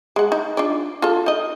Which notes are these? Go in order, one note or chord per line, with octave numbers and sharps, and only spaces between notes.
G#3 F#5
D#4
D4 F4 D5
F4 A4
D#4 D#5